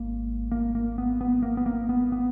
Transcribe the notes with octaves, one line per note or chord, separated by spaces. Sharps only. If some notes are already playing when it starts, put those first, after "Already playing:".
Already playing: G#1 G#2 A#3
A#3
A#3
B3
B3
A#3
B3
A#3
B3
B3